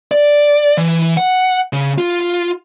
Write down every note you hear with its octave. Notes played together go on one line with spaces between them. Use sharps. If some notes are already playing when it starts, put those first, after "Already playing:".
D5
E3
F#5
C#3
F4